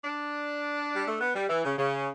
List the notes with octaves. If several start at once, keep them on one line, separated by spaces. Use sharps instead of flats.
D4
G3
A3
B3
G3
E3
C#3
C#3